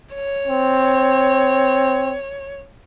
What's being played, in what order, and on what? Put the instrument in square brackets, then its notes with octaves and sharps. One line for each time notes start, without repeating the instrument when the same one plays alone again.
[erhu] C#5
[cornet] C4